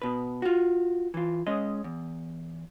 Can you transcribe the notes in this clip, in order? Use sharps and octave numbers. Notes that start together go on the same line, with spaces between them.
B2 B4
F4 F#4
E3 F4
G#3 C#4 D#5
E2